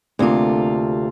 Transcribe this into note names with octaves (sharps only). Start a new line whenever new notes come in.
D2 C3 A#3 F4 A4